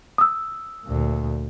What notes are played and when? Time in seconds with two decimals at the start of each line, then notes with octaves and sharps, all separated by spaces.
0.18 D#6 E6
0.85 D2 A#2